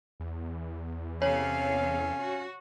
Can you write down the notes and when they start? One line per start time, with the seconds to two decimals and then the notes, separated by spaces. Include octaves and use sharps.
0.20 E2
1.22 C3 C#4 A4 C#5 F5
2.18 F#4